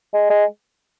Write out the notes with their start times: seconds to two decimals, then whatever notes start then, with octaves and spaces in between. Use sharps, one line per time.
0.13 G#3
0.30 G#3